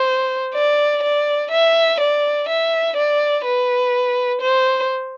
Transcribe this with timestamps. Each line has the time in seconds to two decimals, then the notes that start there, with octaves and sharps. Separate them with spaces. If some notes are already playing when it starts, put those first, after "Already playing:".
Already playing: C5
0.54 D5
1.02 D5
1.51 E5
2.00 D5
2.48 E5
2.96 D5
3.44 B4
4.41 C5